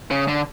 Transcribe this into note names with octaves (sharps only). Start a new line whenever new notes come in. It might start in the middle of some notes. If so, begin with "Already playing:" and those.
C#3
D3